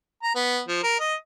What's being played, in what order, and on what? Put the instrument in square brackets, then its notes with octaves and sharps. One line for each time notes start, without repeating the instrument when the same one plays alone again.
[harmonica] A#5
B3
F3
A#4
D#5